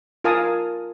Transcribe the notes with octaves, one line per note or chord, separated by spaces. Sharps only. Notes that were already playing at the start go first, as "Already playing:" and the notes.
F4 A#4 F5 G#5 A5 D#6